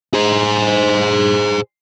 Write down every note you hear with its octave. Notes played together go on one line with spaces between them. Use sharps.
G#4 C5